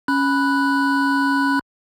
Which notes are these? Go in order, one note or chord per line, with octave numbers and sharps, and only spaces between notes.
C#4 B5 F#6